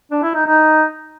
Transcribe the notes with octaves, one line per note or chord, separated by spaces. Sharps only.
D4
E4
D#4
D#4